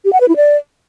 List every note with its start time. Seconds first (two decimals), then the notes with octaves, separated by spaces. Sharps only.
0.05 G4
0.13 F#5
0.21 B4
0.28 E4
0.36 D5